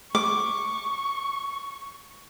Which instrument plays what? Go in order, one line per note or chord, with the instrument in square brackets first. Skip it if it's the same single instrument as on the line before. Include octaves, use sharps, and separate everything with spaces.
[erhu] C#6 [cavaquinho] D6